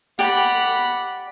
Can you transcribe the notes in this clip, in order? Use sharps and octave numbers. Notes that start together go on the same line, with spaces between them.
G4 D5 F#5 B5